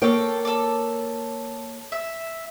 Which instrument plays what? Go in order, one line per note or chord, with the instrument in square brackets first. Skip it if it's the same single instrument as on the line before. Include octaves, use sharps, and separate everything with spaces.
[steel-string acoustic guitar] A#3 C#5 [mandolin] A4 G5
[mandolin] A4 D5
E5